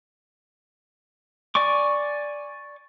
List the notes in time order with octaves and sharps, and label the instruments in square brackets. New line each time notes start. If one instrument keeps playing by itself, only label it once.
[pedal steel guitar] D5 G#5 C#6 D6